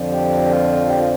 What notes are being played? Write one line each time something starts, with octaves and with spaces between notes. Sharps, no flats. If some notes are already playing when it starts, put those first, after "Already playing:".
Already playing: F2 D3 F3
G4
F4
G4
F4